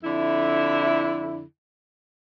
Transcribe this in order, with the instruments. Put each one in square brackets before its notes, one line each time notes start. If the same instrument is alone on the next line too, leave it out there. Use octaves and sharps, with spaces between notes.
[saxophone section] F2 D3 E4